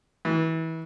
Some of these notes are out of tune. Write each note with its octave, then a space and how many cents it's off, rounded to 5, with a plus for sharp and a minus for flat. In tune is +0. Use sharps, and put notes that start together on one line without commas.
E3 -25